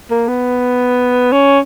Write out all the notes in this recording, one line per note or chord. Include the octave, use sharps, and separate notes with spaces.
A#3
B3
C#4